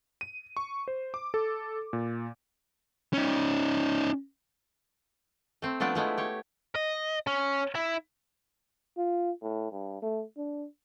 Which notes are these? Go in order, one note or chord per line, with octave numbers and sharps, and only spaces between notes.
D#7
C#6
C5
D6
A4
A#2
C#4 D#4
A3 C4
F3 A3 B3 D4 D5
F3 G#3 A3 B3 E4
G4 C#5
D#5
C#4
E4
F4
A2
G2
A3
D4